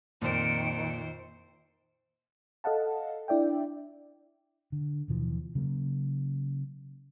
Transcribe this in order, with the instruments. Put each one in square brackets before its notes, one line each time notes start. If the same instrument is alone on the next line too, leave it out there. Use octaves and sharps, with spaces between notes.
[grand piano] F2 A#2 [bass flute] D#3 [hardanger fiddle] C5 [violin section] C#7 D7
[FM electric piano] A4 D#5 F5 F#5 A5
D4 E4 D5 E5 G5
[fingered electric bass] D3
D#2 B2 E3 F3
C#3 F#3 A#3